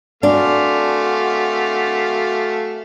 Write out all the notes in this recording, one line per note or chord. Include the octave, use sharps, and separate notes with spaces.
A3 D4 F#4 F5 G#5 C6 D6